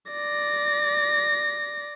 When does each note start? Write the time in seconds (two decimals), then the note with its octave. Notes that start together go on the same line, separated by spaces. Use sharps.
0.12 D5 A#6